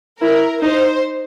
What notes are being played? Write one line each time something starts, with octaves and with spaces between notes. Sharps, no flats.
E4 A#4
D#4 C5